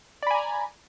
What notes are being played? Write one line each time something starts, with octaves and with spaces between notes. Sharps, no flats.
D5 G#5 A#5 B5